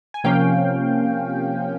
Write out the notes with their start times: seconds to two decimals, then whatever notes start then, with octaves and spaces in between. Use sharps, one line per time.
0.14 G#5
0.24 C3 F3 A#3 C#4 F5 G5